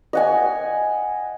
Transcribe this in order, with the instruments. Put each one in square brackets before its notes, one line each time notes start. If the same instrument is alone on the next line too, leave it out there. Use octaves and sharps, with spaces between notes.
[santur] D#5 F#5 G#5